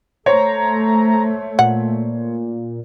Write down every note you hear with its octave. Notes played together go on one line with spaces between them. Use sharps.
A3 C5 C#5 A#5
A#2 F#5